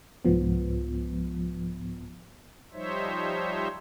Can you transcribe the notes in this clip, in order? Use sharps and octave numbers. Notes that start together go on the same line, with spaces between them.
C2 G#2 F3 B3
F3 G3 D#4 C5 C#5 E5